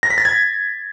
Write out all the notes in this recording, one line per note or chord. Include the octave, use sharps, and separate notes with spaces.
A#6
B6
A6
G#6